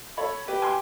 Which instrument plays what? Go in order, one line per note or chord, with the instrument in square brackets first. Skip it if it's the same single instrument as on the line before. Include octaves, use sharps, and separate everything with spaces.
[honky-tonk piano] A4 C#5 B5
[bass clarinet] G4 [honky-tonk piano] B4
[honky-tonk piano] G#5 C6